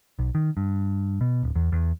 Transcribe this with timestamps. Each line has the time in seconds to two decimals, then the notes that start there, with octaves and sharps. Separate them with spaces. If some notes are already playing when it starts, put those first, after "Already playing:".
0.19 B1
0.35 D#3
0.57 G2
1.21 B2
1.43 D1
1.55 E2
1.72 E2